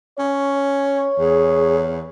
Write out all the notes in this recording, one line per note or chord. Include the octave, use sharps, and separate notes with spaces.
C#4 C#5
E2 G#4